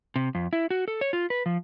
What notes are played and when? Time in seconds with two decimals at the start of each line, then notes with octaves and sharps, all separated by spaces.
0.16 C3
0.35 F2
0.53 E4
0.71 F#4
0.88 A4
1.01 C#5
1.13 F4
1.30 B4
1.46 F3